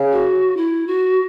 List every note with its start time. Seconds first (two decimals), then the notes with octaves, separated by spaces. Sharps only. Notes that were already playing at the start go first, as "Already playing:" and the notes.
Already playing: C#3
0.12 F#4
0.57 E4
0.87 F#4